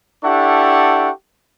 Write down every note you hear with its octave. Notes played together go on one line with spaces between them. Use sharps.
D4 E4 G4 A4 F#5 C#6